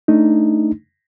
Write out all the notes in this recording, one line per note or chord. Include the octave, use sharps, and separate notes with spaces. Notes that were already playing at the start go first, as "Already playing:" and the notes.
A3 D4 D#4